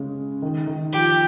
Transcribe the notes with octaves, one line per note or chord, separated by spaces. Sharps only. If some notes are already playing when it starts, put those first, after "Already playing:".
Already playing: C#3 G#3
D#3
D#3
F3 G4